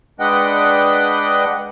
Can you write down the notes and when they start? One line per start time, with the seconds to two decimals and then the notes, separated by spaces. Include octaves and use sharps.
0.20 G#3 D4 B4 D#5 F#5 G5